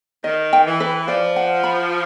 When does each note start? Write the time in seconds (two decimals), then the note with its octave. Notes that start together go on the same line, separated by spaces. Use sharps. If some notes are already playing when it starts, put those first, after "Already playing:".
0.24 D#3 D#5
0.53 G5
0.66 E3
0.80 B4
1.07 F3 D5
1.36 F#5
1.63 B5